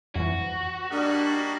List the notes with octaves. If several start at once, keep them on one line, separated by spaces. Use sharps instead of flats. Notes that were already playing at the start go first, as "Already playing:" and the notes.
F2 E3 F#4
G3 A#3 D4 D#4